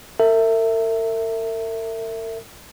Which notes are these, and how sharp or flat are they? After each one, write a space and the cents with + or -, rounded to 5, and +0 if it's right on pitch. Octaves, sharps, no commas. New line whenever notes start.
A#4 -45 E5 +0